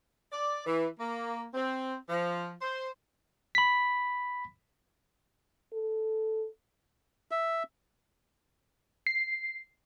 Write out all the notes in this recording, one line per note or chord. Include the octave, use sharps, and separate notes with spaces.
D5
E3
A#3
C4
F3
C5
B5 B6
A4
E5
C7